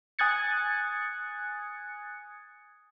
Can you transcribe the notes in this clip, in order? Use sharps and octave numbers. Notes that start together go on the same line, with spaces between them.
G#5 D#6 F#6 G#6 A6 C#7